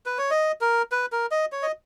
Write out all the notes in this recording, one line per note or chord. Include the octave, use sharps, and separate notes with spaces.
B4
C#5
D#5
A#4
B4
A#4
D#5
C#5
D#5